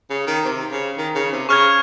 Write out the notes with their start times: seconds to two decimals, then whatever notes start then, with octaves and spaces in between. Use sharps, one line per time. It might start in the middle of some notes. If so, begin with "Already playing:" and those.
0.10 C#3
0.27 D#3
0.45 C3
0.72 C#3
0.97 D#3
1.15 C#3
1.32 C3
1.49 C#3 C#6 F6 G#6